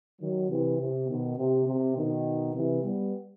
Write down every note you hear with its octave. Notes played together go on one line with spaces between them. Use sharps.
D#3 F#3
C3 E3
C3
B2 D#3
C3
C3
B2 D#3
C3 E3
G3 B3